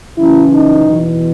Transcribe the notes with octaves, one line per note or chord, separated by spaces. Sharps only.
F#2 C#3 E3 E4
D#4
E2 B2